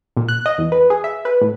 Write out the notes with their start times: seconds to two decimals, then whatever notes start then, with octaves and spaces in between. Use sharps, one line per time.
0.17 A#2
0.28 F#6
0.46 D#5
0.58 E2
0.72 B4
0.90 G#4
1.04 E5
1.25 B4
1.41 A2